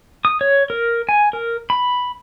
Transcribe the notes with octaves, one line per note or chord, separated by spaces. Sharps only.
D#6
C#5
A#4
G#5
A#4
B5